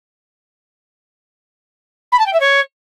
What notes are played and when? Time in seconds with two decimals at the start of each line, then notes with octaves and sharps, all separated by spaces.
2.12 B5
2.19 A5
2.26 G5
2.33 E5
2.40 C#5